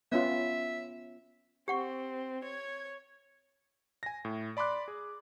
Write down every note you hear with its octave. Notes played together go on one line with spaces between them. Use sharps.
B3 C#4 F4 E5
C4 G4 F#5 C#6
C#5 G#6
G#5 A#6
A2
D5 B5 C6 D6 F#6
G#4